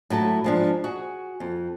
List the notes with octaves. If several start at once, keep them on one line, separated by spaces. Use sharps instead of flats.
A2 F#3 E4 A5
G#2 F3 D4
F#4 G#4
F2